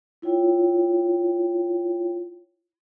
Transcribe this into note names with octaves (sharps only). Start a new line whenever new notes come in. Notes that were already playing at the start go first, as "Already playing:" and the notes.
E4 F4 C#5 G5